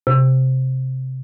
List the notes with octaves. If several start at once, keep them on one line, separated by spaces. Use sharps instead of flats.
C3